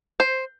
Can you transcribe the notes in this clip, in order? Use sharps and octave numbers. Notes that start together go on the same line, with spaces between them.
C5